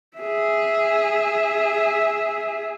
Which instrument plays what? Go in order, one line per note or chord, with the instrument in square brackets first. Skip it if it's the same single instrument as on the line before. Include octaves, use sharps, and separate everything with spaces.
[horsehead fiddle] G#4 E5